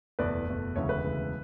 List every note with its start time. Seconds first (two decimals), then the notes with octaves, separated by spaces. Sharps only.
0.19 F#1 E2 B2 A3 B4 D5
0.47 F#1 E2 B2 A3
0.76 E1 D2 C#3 E3 C#5
0.89 B4
1.03 E1 D2 C#3 E3